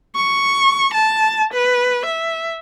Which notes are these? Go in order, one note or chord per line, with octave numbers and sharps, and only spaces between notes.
C#6
A5
B4
E5